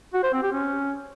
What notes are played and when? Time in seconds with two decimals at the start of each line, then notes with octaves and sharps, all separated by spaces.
0.14 F#4
0.24 C5
0.33 C4
0.43 G4
0.52 C#4